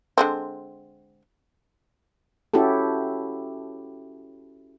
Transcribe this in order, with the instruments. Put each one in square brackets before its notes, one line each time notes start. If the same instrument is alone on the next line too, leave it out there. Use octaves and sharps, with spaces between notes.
[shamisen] D3 G#3 C4
[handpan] C#4 E4 F#4 G4 A4